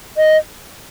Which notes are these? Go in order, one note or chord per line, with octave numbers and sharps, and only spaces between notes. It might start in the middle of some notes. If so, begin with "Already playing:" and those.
D#5